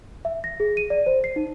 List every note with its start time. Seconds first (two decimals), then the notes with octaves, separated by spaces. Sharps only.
0.25 E5
0.44 A#6
0.60 G#4
0.77 D#7
0.90 D5
1.06 C5
1.24 C7
1.36 D#4